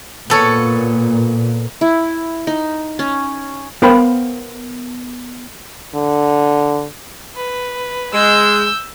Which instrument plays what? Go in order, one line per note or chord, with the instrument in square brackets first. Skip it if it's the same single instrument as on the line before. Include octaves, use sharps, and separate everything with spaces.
[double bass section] A#2 [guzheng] B3 A4 C#5
[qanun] E4
D#4
C#4
[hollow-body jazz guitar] B3 A#4 C5 F5 G5 B5
[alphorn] D3
[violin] B4
[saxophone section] G#3 [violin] E6 G6